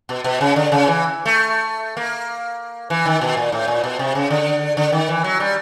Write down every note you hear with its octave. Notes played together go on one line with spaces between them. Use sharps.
B2
B2
C#3
D3
C#3
E3
A3
A#3
E3
D#3
B2
A#2
A2
A#2
B2
C3
C#3
D3
D3
D#3
E3
F#3
G3